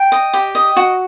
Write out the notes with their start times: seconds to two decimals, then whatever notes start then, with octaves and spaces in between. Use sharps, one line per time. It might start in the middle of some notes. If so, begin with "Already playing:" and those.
Already playing: G5
0.12 D#5
0.33 G4
0.55 D#5
0.76 F#4